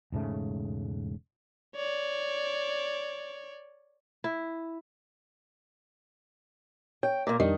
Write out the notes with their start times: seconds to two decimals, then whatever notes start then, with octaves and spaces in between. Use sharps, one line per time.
0.12 E1 G#2 C#3 A3
1.76 C#5 D5
4.24 E4
7.03 C#5 G5
7.27 A#2 A#3
7.40 F2 D#3 G3 D4